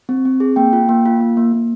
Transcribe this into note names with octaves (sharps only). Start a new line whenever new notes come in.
C4
C4
G#4
A#3 G5
F4
A#3
F4
A#3
A#3
A#3